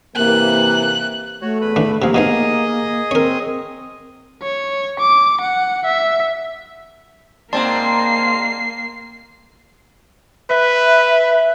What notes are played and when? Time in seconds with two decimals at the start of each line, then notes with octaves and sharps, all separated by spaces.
0.16 C3 E3 A#3 F#6
1.42 A3 F#4 C#5
1.61 E2 B4 B5
1.76 E3 D4
2.02 C3 F3 A#3 C4 G#4 A#4
2.14 B2 F3 D#4 G#4 D#5 D#6
3.11 C4 A#4 C#5
4.42 C#5
4.99 D6
5.41 F#5
5.85 E5
7.53 G#2 A#3 C4 D5 A5 C6 C7
10.51 B4 E5